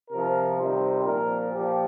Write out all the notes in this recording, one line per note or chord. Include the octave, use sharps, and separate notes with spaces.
C3 F3 A#4
C3 D#3 G3 C5
A#2 F3 A#4
A#2 F3 G4